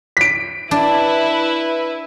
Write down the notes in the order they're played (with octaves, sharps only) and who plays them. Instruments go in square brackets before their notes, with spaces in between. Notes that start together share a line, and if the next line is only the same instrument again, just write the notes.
[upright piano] B6 D7
[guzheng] D4 [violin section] E4 B4